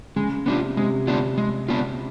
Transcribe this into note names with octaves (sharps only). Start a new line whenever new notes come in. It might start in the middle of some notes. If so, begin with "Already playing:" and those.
C#3 G#3
C3 B3 D4 F4
C3 G#3
B3 D4 F4
G#3
B3 D4 F4